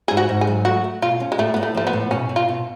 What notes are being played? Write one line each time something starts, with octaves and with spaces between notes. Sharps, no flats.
G#2 G#4
F#4
G#2
G#4
F#3
A3 F#4
A3
B2 F4
C#4
G#3
A2 A3
A2 B3
A3
F3 A3
B3
A2
B2 C#4
B2
F4
B2